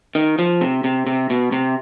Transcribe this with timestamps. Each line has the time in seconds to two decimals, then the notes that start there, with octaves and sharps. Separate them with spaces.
0.15 D#3
0.39 F3
0.61 C3
0.84 C3
1.07 C3
1.30 B2
1.52 C3